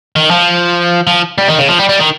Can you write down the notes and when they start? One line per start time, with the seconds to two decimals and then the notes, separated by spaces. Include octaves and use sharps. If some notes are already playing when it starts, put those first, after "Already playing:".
0.16 D#3
0.31 F3
1.07 F3
1.38 G3
1.48 D#3
1.59 C#3
1.68 F3
1.79 G3
1.89 G3
1.99 D#3